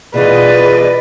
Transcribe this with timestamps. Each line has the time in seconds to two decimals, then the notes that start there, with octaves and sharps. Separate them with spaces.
0.14 B2 E3 F4 G#4 B4 D5 D#5